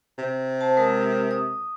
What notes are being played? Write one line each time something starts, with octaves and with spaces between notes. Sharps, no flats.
C3
C5 A5
G#3 A#4 D#6
D#6